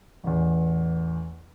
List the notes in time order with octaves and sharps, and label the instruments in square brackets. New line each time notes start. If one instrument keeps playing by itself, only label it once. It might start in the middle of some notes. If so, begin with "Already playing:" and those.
[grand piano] A1 E2